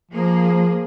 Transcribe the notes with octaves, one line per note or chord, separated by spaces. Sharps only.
F3 A#3 G#4